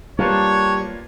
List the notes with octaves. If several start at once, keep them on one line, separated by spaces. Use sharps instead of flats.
G3 A#3 D4 F4 G4 B4 C#5